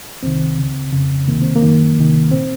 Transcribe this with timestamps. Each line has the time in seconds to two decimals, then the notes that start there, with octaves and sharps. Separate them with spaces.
0.23 C2 C3 D#3 C4
0.58 C#2 C#3
0.92 F2 C#3
1.27 C#2 C3 D#3 A#3
1.42 C4
1.56 A#3
1.62 F#2 D#3
1.97 C2 C3 D#3
2.31 A#2 C4